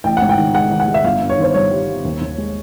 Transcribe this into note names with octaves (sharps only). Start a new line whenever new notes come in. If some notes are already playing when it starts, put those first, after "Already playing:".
A1 G5
F#5
G#2
G5
D#3
G#3 F#5
D#3
F#5
G#3
E5
G1 F5
G2
C#5
D#3 C5
G1 C#5
G3
G3
D#2
D#2
G#3